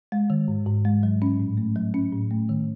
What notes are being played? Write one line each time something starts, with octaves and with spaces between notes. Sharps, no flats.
G#3
D#3
G#2
G#2
G#3
F#3
C#4
A2
A3
F#3
C#4
A2
A3
D#3